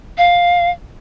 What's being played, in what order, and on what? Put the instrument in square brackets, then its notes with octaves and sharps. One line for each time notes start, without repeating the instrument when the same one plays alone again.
[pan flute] F5